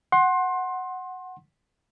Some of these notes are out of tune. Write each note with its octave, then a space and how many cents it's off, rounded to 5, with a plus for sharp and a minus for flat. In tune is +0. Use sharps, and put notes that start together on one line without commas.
F#5 +0 C6 +25